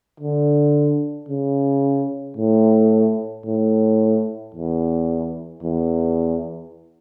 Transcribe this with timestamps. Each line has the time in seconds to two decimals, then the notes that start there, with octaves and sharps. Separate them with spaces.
0.20 D3
1.29 C#3
2.37 A2
3.46 A2
4.54 E2
5.63 E2